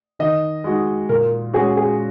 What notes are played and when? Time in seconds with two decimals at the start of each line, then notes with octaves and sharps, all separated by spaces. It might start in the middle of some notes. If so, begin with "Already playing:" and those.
0.19 D#3 D#5
0.64 G#3 D#4 F#4
1.09 A#2 A#4
1.54 G#3 C#4 F#4 G#4
1.77 G#4